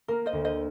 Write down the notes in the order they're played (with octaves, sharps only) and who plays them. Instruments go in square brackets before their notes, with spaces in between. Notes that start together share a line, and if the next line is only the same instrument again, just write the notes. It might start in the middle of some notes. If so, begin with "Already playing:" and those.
[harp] A#3 [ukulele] A#4
[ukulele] C5 D#5
[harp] D2
[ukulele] C5 D#5